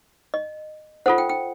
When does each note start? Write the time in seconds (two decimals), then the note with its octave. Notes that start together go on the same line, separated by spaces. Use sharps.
0.34 D#5
1.06 F4 A4 C5 F#5
1.18 G5
1.29 G5